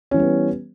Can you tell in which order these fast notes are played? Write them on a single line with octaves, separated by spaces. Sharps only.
C#4 E3 G3 B3